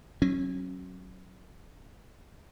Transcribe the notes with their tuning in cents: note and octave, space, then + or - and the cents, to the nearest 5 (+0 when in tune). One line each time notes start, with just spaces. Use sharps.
F#3 +0 C#4 -30